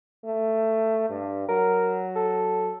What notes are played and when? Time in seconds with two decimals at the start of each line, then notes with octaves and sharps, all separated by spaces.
0.24 A3
1.09 G2
1.49 F#3 A#4
2.16 A4